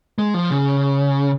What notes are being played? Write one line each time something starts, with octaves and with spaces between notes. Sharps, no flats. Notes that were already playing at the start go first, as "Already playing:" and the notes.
G#3
F3
C#3